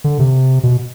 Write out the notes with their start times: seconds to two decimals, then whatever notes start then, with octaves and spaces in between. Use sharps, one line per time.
0.04 D3
0.19 C3
0.63 B2